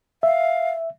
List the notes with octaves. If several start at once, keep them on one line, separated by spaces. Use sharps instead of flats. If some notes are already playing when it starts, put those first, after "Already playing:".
E5 F5